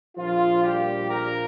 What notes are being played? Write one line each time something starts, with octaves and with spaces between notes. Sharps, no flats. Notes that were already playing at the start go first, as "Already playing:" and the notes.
A#1 A#2 F3 F4
G3 G4
A#3 A#4